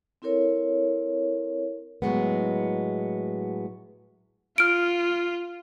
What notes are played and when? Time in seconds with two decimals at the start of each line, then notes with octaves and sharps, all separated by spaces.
0.22 C4 E4 A4 A#4 C#5
2.02 A2 F#3 G#3 B3
4.58 F4 F6 D7